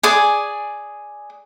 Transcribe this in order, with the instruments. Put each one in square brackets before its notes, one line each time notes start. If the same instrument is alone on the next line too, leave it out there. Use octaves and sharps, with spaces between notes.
[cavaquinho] G#4 D5 G#5